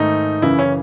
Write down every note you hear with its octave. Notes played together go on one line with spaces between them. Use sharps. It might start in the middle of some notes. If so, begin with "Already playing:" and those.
Already playing: G#2 D#3 A3 D#4
F#2 C#3 E3 E4
C#4